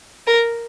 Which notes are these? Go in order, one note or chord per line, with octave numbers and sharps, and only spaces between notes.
A#4